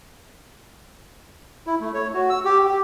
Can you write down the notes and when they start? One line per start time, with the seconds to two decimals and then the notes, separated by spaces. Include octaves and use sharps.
1.67 E4
1.81 A3
1.94 C#5
2.14 F#4
2.30 E6
2.45 G4
2.65 G4